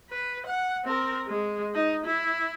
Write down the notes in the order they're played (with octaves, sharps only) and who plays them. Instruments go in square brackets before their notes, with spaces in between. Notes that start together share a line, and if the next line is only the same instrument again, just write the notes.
[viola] B4
F#5
C4 A#4
G#3
D#4
E4